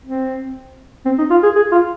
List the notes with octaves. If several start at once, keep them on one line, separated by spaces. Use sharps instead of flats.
C4
C4
D#4
F4
G#4
G#4
F4